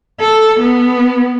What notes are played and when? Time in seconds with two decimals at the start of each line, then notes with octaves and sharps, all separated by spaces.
0.20 A4
0.60 B3